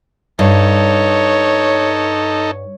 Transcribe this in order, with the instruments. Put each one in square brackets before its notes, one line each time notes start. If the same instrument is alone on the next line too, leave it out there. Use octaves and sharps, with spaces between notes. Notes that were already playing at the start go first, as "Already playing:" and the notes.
[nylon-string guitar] G2 [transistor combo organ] D#4 A4 [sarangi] C#5